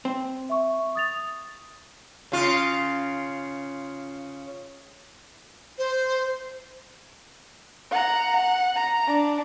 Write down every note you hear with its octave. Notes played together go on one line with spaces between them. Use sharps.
C4
E5 C#6
D#6 A6 F7
C#3 F4
C5
F#5 A#5
F#5
A#5
D4